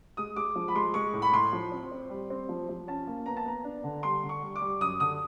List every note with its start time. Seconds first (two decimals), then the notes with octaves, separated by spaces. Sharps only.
0.17 G#3 D#6
0.36 G#3 D6
0.55 F3
0.68 B5
0.75 G#3 C6
0.94 G#3 C#6
1.13 A2
1.22 B5
1.33 A2 C6
1.52 F3
1.72 C4
1.92 C4
2.10 G3
2.30 C4
2.49 F3
2.69 F3
2.87 C#4 A5
3.07 A#3
3.26 B3 A#5
3.37 A5
3.45 B3 A#5
3.64 D4
3.84 D3
4.03 G3 C6
4.23 D3
4.29 C#6
4.43 G3
4.56 D6
4.61 G3
4.80 F#2 D#6
5.00 D3 D#6